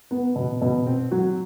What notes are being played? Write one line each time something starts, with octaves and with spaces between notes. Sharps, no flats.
B3
B2
B2
C4
F#3